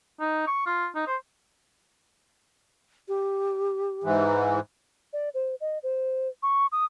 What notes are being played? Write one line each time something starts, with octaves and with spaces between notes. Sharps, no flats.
D#4
C#6
F4
D#4
C5
G4
G#2 E3
D5
C5
D#5
C5
C#6
D#6